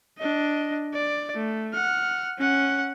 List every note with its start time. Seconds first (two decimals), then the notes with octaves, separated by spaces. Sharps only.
0.18 D4 D#5
0.93 D5
1.35 A3
1.73 F#5 F6
2.38 C#4 F#5